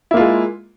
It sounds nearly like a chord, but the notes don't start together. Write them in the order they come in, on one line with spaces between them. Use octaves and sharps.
E4 A#3 F4 G#3